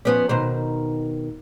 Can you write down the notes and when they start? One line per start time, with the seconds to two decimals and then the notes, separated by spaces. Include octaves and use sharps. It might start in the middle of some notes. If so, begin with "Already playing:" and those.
0.05 F3 B3 C#4
0.29 B2 D#3 C5